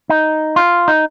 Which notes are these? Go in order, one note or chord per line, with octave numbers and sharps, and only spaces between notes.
D#4
F4
D#4